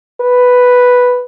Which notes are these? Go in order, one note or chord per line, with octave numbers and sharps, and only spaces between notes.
B4